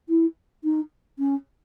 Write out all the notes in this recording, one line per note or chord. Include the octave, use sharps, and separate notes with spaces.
E4
D#4
C#4